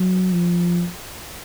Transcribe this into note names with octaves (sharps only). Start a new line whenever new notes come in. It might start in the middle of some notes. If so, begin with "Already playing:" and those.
Already playing: F#3
F3